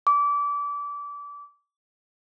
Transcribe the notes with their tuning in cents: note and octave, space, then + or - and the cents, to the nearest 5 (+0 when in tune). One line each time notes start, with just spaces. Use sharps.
D6 -25